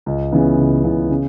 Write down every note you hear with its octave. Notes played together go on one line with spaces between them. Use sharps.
C#2
C#3 E3 B3
C#2
C#3 E3 B3
C#3